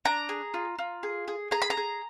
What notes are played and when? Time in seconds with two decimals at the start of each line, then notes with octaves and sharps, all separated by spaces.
0.05 D4 A#5
0.29 G#4
0.54 F4
0.79 F4
1.03 G#4
1.28 G#4
1.51 G#4 A#5
1.62 B5
1.70 A#5
1.77 G#4